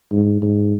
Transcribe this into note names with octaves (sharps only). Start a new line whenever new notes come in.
G#2
G#2